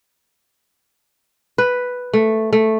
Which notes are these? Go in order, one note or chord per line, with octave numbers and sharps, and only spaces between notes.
B4
A3
A3